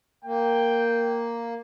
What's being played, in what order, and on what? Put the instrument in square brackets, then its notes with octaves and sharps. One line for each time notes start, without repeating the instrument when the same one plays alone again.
[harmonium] A#3 [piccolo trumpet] G5